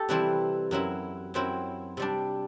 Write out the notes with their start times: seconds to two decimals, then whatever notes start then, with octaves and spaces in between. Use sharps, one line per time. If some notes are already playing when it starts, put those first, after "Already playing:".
Already playing: G4 A4
0.09 C3 E3 G3 C4 E4 B4
0.71 F#2 F#3 C4 E4
1.34 F#2 F#3 C4 E4 C5
1.97 C3 G3 D4